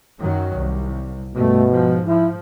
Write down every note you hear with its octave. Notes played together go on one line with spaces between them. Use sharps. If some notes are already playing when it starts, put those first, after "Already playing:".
F#2 D#3 F#3
C2
G2 B2 A3
G#2 F3
F3 E4